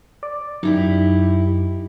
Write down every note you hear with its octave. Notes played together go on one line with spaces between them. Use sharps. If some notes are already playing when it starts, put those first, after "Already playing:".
D5
F#2 D#4 E4 G4